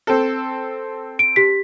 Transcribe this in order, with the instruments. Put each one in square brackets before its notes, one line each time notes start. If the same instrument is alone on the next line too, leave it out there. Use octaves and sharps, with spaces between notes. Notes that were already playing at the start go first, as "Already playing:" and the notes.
[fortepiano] C4 A4
[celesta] D7
G4 B6